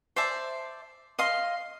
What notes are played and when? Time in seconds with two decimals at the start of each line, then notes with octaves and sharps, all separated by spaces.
0.16 C5 D5 E5 A5
1.19 D#5 F5 C6